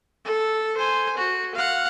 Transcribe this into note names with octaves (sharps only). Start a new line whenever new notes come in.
A4
C5 G#5
F#4
F5 F#5